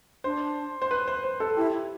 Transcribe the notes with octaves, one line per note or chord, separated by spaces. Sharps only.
D4 C5
C5
B4
C5
C5
A4
E4 G4